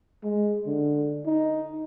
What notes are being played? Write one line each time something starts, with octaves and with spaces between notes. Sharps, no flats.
G#3
D3
D#4